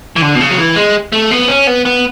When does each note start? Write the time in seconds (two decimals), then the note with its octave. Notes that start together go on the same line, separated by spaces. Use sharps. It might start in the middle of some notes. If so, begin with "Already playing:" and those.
0.16 E3
0.22 D3
0.35 B2
0.40 C#3
0.51 F#3
0.58 E3
0.76 G#3
1.12 A3
1.31 B3
1.48 C#4
1.67 B3
1.85 B3